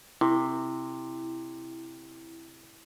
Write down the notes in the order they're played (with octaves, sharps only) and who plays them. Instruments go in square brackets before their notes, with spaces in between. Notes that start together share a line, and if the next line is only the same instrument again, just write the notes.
[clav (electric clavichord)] C3 [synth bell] E4